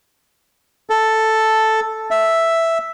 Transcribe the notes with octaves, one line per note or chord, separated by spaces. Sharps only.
A4
E5